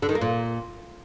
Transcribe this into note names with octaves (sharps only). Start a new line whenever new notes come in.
D3
D#3
A#3
A#2